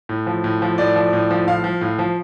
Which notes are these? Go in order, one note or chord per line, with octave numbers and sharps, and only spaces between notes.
A2
F3
A2
F3
A2 D5
F3
A2
F3
A2 F5
F3
A2
F3